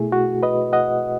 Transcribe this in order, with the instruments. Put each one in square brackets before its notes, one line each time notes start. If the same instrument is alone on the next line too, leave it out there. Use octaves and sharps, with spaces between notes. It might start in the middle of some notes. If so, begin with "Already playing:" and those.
Already playing: [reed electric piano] B2 A3 E4 G#4
F#4
B4 D#5
D#5 F#5